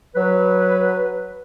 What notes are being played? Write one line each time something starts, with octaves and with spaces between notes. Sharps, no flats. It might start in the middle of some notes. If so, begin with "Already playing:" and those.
F#3 B4